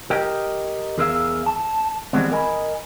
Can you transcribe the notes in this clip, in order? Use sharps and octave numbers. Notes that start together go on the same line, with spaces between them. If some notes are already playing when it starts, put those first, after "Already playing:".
G4 A#4 D#5 G5
E2 G#4 A#4 B4 E5 F5
A5
E3 G3 G#3 B3 C4
A#4 D#5 G#5 B5